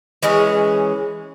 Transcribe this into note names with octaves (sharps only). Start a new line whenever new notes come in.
E3 G#3 C#4 G#4